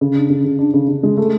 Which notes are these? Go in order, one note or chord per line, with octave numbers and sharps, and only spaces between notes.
C#3
D4
C#3
C#3
D4
C#3
C#3
G#3
A3